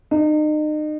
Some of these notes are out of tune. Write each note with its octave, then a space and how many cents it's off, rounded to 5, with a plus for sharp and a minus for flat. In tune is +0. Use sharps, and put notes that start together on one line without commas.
D#4 -35